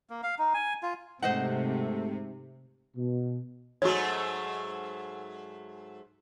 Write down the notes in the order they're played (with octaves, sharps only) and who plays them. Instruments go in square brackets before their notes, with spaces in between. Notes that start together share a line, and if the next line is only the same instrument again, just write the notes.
[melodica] A#3
F5
D#4
G#5
F4
[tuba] G#2 [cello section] C3 [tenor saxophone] A3 [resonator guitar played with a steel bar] C5 D#5 F#5
[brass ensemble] B2
[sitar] G#2 F#3 A3 [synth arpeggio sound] F#4 C#5